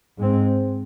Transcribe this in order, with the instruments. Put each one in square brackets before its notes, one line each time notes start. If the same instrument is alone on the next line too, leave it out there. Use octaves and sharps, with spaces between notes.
[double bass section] G#2 G#3 C4